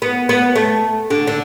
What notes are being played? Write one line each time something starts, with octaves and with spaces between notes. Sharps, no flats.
B3
B3
A3
D3
D3